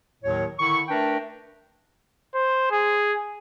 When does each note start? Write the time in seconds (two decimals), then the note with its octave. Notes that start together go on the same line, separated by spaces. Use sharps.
0.22 D#2 A2 D#3 F#3 C#5
0.58 D3 D#3 E4 C#6
0.88 A3 D4 A#4 B4 G5 A5
2.35 C5
2.71 G#4